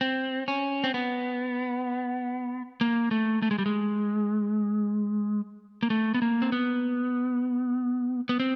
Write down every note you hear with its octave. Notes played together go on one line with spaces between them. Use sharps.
C4
C#4
C4
B3
A#3
A3
A3
G#3
G3
G#3
A#3
A3
B3
A#3
C4
B3
B3
C4